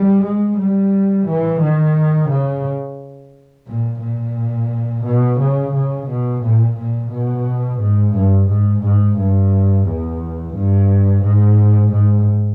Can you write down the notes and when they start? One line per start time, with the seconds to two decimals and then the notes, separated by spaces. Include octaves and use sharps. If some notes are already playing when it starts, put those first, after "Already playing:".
Already playing: G3
0.23 G#3
0.58 G3
1.26 E3
1.60 D#3
2.29 C#3
3.66 A#2
4.00 A#2
5.04 B2
5.39 C#3
5.73 C#3
6.07 B2
6.42 A#2
6.77 A#2
7.11 B2
7.79 G#2
8.14 G2
8.48 G#2
8.82 G#2
9.17 G2
9.86 E2
10.54 G2
11.23 G#2
11.92 G#2